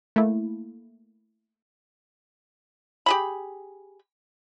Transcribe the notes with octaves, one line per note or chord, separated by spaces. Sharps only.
A3 A#3 E4
G4 G#4 B5